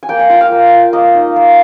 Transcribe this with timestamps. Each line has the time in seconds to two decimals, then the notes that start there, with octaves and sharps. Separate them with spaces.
0.03 G#5
0.09 A#3 G5
0.19 G#5
0.30 F4 G5
0.41 F5
0.52 A#3
0.72 F4
0.93 A#3 D#5
1.14 D#4
1.36 A#3